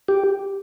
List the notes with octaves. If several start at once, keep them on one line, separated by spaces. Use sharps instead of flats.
G4